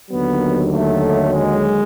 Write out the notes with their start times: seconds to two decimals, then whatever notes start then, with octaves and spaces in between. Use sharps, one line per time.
0.11 D#2 D3 F#3 B3
0.72 A3
1.33 G#3